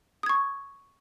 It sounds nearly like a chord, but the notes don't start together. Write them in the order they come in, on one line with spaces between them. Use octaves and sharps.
D#6 G#6 C#6